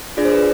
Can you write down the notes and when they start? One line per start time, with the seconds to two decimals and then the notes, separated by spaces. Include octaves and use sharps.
0.17 D4 F4 G#4 D5
0.25 C5
0.32 B4